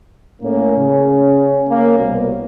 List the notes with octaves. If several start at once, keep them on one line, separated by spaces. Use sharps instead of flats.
A2 A#3 C#4
C#3
A#3
C2 B2